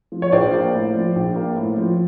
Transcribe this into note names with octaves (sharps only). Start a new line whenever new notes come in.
F3
C#5
A#1 C5 D5
A#3
A2
F3
A#1
A#3
A2
F3